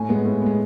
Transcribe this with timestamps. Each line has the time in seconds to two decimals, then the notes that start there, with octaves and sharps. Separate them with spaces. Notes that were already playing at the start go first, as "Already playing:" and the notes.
Already playing: A2 G#5
0.09 G#3 B3
0.25 A2
0.42 G#3 B3